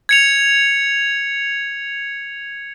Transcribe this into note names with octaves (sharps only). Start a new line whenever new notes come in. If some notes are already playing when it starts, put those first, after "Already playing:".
G#6 C#7 F7